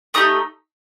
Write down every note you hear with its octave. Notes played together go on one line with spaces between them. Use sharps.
A3 D#4 G4 D#6